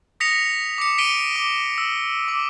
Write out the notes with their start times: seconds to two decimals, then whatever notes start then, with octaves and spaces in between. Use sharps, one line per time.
0.20 D#6 A#6 B6 C#7 F7
0.78 D6 C#7
0.98 B6 D7 D#7 G7
1.36 D6
1.78 E6
2.28 D6